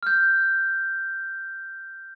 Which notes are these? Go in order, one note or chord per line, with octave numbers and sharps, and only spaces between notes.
F6 G6